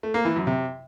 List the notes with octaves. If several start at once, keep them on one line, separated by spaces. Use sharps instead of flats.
A3
A#3
E3
F#2
C3